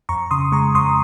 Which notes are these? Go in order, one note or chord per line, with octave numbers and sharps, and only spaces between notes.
F2 A#5 C#6
C#3 C6 D#6
G#3 A#5 C#6
F2 C6 D#6